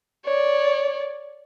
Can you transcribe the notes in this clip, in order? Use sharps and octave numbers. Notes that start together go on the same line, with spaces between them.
C#5 D5